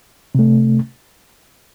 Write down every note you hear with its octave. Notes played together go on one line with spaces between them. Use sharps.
C3 A3